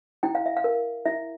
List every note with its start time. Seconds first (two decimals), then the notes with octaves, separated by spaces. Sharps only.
0.23 E4 G5
0.35 F5
0.46 E5
0.57 F5
0.64 A#4
1.05 E4 E5